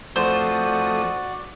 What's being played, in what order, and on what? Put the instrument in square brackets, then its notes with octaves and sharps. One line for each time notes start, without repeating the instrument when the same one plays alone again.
[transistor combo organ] F2 A3 D#6 [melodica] F#4 D5 [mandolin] C5